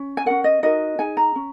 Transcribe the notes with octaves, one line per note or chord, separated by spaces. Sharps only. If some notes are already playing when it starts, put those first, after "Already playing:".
Already playing: C#4
G#5
C#4 F#4 A#4 F#5
D#5
D#4 F#4 A#4 D#5
D#4 G#4 G#5
A#5
C#4